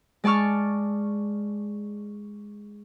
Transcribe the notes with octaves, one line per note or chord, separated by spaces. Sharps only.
G#3 D5 A5 C#6 F6